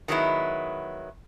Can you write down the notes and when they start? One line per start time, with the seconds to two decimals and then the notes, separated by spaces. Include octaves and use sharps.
0.08 D#3 F#3 G#3 B3 E4